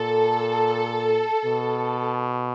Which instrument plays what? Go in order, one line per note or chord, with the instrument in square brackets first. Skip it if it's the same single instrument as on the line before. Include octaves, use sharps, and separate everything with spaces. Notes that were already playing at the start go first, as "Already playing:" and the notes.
Already playing: [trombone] A#2 [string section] A4
[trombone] B2